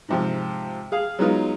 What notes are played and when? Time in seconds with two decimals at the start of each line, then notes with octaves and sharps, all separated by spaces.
0.08 G#2 C3 F3
0.92 G#4 F5
1.19 F#3 G#3 B3 D#4 F4